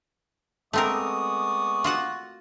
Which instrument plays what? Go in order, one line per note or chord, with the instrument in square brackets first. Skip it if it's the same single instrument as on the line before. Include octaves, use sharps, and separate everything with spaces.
[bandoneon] G#3 B3 D#6 [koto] A3 C4 A#4 [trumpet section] D5 C#6
[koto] F4 F#4 F#5